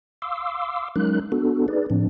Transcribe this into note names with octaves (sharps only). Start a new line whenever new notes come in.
F5 C6 D6 E6
F#3 G#3 C#4 D#4 A#4 F#6
B3 D4 F#4 A4
D#4 G#4 B4 D5
A2 F3 C4 D4